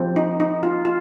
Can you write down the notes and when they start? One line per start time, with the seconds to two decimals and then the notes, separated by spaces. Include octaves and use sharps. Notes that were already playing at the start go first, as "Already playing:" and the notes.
Already playing: F3 C4
0.16 D#4
0.40 D#4
0.63 F4
0.85 F4